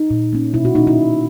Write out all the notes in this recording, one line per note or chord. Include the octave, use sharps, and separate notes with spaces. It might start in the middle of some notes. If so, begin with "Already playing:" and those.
Already playing: D#4
A#2
A#3 C#4
B2 E4
F#4
A#3 C#4 D#4
E4
B2